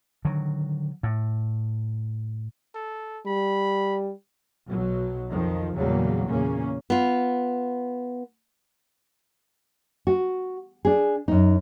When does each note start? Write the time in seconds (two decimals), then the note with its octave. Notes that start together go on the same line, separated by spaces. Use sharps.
0.25 D3 D#3 F#3
1.03 A2
2.74 A4
3.26 G3 B5
4.68 B1 B2 F#3
5.31 F2 D#3 F3
5.76 E2 A#2 C#3 F#3 G3 A#3
6.28 E2 A#2 C#3 A#3 C#4
6.90 B3 F4
10.07 F#4
10.85 D4 G#4
11.28 F#2 D#4